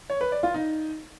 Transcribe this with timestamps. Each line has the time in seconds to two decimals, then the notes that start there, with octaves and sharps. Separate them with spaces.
0.10 C#5
0.21 B4
0.32 D5
0.43 F4
0.54 D#4